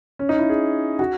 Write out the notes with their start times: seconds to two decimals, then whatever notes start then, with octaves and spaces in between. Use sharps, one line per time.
0.19 C#4
0.29 D#4
0.39 E4
0.49 G#4
0.99 F#4